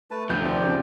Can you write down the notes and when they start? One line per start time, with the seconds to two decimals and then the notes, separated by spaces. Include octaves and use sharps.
0.11 A3 B4 A5
0.30 D2 C3 F3 B5 G6
0.43 D#2 C4 D5
0.63 C2 C#3